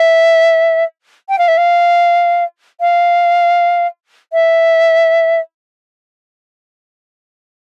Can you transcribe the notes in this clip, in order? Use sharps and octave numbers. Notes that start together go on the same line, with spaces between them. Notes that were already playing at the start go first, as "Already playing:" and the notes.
Already playing: E5
G5
F5
E5
F5
F5
E5